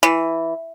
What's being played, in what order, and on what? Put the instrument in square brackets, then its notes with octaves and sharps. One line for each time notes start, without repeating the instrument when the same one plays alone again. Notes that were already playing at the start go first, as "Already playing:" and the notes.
[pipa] E3